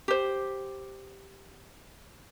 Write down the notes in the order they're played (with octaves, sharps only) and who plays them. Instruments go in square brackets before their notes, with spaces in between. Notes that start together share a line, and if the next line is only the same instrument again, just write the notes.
[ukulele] G4 C5